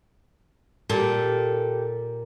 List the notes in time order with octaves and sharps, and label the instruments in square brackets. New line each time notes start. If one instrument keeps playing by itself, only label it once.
[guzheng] A#2 [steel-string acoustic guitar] G4 A4